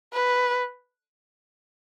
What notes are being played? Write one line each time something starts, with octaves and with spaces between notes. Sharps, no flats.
B4